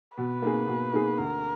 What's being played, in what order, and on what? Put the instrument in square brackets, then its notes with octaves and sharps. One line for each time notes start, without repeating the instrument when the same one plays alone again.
[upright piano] B2 [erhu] B4
[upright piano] A#3 D#4 G#4
B2
A#3 D#4 G#4
[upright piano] D2 [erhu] A#4